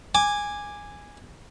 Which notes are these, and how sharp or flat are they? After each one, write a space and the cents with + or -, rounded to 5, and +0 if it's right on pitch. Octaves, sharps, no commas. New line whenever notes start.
G#5 -10 D6 +10